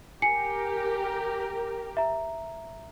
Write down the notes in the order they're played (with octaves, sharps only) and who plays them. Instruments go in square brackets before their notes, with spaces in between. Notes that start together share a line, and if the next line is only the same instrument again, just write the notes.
[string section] G4 A#4 [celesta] G#5 C7 C#7
[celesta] E5 A#5